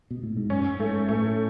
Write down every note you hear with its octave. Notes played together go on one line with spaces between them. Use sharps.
B2
A2
G#2
F#2 C#4
G#2 A3
A2 A3